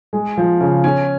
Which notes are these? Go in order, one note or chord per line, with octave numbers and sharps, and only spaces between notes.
G#3
F3
C#3
C#4